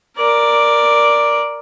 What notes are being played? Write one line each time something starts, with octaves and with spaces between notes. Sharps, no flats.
A#4 D5